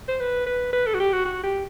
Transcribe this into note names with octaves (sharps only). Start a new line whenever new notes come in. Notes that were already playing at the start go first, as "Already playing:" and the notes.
C5
B4
B4
B4
A4
F#4
G4
F#4
F#4
G4